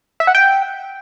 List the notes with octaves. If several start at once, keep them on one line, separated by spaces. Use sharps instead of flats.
E5
F#5
G5